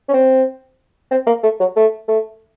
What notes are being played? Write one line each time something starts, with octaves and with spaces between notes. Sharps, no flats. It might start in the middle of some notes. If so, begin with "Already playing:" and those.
C#4
C4
C4
A#3
A3
F#3
A3
A3